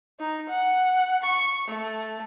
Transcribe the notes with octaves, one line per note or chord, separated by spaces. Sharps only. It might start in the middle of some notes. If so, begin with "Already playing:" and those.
D#4
F#5
C#6
A3